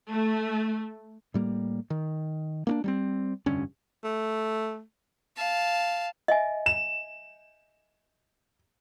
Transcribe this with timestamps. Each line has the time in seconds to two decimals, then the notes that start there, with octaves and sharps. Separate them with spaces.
0.11 A3
1.34 A2 G3 A#3
1.90 D#3
2.67 A#3 C#4 D4
2.84 G3 A#3 C4
3.46 F1 G2 D3 C#4
4.04 A3
5.37 F5 A5
6.28 D#5 E5 G#5
6.66 E7